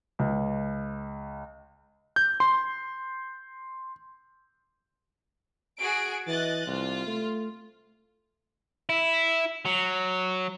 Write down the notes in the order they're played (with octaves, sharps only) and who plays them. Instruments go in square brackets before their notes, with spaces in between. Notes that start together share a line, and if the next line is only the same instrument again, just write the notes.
[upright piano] C#2
[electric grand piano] G6
C6
[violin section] F#4 G#4 D7
[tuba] E3 [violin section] D#5 F#6 A6
[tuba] C2 [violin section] F4
[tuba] A3
[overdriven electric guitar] E4
F#3